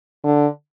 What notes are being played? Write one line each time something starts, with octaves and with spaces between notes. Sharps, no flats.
D3